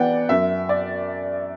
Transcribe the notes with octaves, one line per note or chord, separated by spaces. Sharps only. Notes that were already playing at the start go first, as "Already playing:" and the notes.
Already playing: E3 B3 D5 F#5 G5
F#2 E5
D5